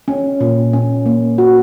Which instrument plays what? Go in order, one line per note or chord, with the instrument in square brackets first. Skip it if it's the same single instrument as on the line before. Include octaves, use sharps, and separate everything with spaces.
[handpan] C#4
A#2
C#4
A#3
F#4